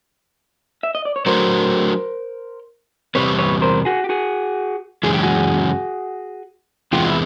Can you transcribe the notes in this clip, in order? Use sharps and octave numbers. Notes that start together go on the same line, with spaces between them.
E5
D#5
D5
C#5
F#3 A3 D4 F#4 A#4 C5
E2 C3 D#3 G3 C4 B4 C#5
B4 C#5
A#4 C5
F#4 G#4
G4
F#4 G#4
F#2 C#3 E3 G#3 C#4 G#4
G4
F#4 G#4
E2 C3 E3 G#3 B3 F4 G4
E4